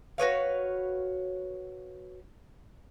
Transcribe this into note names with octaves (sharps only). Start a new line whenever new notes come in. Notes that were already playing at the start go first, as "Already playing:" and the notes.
F#4 B4 C#5 F5